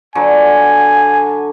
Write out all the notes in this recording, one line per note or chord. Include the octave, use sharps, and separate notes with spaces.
D3 F#3 G#5